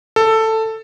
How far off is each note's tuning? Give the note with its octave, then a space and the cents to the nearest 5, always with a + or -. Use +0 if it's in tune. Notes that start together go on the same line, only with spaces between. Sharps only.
A4 +10